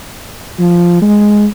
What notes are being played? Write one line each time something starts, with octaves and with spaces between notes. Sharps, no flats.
F3
G#3